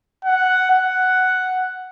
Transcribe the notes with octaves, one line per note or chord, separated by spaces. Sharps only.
F#5
F#5